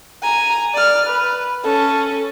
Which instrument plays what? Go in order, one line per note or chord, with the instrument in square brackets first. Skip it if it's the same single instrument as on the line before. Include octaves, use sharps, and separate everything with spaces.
[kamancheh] G#5 A#5
D5 F6
B4
C#4 A4